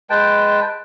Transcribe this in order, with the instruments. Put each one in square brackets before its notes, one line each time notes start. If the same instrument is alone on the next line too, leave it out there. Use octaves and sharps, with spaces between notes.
[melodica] G#3 B4 G5 A5